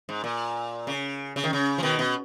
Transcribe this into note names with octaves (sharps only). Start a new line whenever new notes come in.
G#2
A#2
C#3
C#3
D#3
C#3
F3
B2 D#3
B2